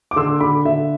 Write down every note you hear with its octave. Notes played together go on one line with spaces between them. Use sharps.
D6
D3 C6 E6
D3 B5 D6
D3 E5